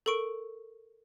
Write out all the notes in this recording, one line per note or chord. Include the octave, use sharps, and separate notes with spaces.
A4 A#4 C#6 D7